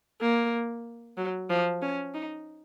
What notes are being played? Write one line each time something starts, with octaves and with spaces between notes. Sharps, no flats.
A#3
F#3
F3
C#4
D#4